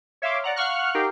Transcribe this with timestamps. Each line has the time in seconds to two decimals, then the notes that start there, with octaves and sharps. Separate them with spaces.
0.22 C#5 E5 F5 C6 D6
0.44 D5 F#5 A#5
0.56 F5 F#5 C#6 F6 F#6
0.94 D#4 G4 A#4 F5 G5